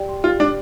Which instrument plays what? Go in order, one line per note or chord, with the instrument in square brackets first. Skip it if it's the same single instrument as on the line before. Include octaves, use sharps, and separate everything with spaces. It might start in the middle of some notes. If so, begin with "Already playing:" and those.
Already playing: [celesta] G4 D5 G5
C6
[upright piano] F4 [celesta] G4
[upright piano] D4 [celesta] D5